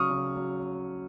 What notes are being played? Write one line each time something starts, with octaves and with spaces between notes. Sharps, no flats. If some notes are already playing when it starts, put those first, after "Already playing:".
Already playing: C#3 F#3 C#6 D#6 F6
C#3
F#3